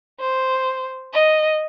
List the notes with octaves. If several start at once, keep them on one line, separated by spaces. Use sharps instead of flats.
C5
D#5